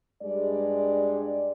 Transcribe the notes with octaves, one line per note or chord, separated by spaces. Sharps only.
G2 G3 G#3 D5